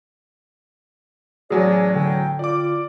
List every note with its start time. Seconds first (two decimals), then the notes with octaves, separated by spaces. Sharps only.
1.50 A1 F#3 G#4 D5 G#5
1.95 D3 G5
2.39 F4 D5 D6